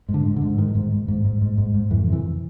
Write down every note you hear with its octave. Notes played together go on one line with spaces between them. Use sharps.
G#2
D3
G#2
D3
G#2
G#2 D#3
G#2
G#2
G#2
G#2
G#2
G#2
G#2
F2 E3
C3
E3